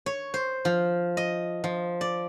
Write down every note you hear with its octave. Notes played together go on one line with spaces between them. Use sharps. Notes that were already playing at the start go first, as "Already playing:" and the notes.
C#5
C5
F3
D#5
F3
D5